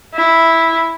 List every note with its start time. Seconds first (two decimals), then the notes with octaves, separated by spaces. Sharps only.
0.15 E4